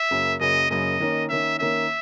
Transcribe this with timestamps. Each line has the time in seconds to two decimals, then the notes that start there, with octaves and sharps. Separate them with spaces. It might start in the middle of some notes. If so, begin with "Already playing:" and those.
Already playing: E5
0.11 F#2 C#3 F#3 A#3
0.40 F#2 C#3 F#3 A#3 D#5
0.70 F#2 C#3 F#3 A#3 D#5
1.00 D#3 A#3 C#4
1.29 D#3 A#3 C#4 E5
1.59 D#3 A#3 C#4 E5